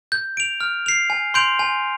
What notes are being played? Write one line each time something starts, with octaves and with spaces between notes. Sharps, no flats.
G6
D7 F7
F6
C7 F7
G#5
C6 G6 D7 F7
G#5